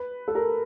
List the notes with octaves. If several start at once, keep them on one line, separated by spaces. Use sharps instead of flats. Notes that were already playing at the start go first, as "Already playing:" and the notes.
Already playing: B4
A4
A#4